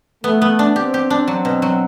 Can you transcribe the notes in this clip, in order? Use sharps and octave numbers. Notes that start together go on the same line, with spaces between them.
A3 B3
B3
D4
C4 G4
G4
D4
F#3
B2
F#3